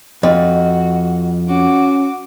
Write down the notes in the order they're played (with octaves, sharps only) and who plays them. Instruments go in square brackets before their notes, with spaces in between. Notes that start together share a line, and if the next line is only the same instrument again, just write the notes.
[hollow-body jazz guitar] F2 [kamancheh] F#4 [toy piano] D#5
[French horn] C#4 [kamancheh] F#4 D6